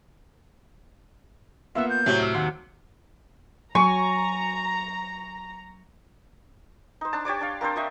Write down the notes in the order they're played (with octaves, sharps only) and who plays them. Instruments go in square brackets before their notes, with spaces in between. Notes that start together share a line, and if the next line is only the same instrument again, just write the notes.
[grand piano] A#3 B3 [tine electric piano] F4 F#5 [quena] E5
[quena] G6
[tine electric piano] A2 [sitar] C3 F#3 [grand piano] C#5
[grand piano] E6 F6
[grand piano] D#2 [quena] F#5 [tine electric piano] C6
[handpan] F#3 [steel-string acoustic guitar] G#5 [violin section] A#5 [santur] C#6
[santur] D#4 C5
D4 A5
G4 C#5 D5 D6
D4 F5
A#3 C4 D4 C5
C5 D#5 E5 C#6